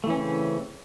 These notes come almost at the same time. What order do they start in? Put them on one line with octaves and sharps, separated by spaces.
A3 E3 C#4 C4 C#3